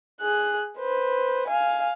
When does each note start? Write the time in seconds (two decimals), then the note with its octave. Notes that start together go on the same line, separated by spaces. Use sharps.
0.20 G#4 F#6
0.78 B4 C5
1.48 F5 G#5